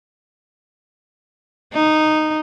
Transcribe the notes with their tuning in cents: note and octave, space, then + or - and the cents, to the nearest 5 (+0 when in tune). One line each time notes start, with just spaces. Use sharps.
D#4 -10